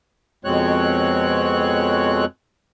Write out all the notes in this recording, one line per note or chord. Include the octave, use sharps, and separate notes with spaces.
F2 B2 G#3 C4 C#5 F#6